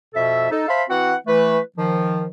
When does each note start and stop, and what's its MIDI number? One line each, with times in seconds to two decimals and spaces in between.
0.14 0.51 41
0.14 0.51 47
0.14 0.51 69
0.14 0.51 76
0.51 0.66 63
0.51 0.66 69
0.68 0.83 72
0.68 0.83 76
0.68 0.83 77
0.68 0.83 81
0.68 0.83 83
0.68 0.83 84
0.89 1.14 52
0.89 1.14 60
0.89 1.14 66
0.89 1.14 78
1.26 1.59 52
1.26 1.59 57
1.26 1.59 71
1.76 2.27 51
1.76 2.27 53